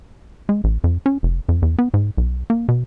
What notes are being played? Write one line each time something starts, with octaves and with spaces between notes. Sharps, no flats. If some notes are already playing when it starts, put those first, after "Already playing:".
G#3
A1
F2
C#4
F1
F2
E2
B3
G#2
B1
A#3
B2